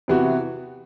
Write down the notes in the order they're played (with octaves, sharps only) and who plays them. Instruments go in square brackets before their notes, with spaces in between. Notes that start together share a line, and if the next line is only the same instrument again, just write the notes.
[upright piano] C3 E3 B3 F#4